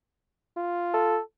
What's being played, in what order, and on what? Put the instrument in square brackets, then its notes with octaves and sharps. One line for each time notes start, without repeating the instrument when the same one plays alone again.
[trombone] F4
[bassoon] A4